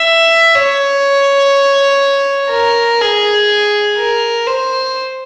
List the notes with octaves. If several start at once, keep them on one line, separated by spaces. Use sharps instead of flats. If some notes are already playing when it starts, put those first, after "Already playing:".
Already playing: E5
C#5
A#4
G#4
A#4
C5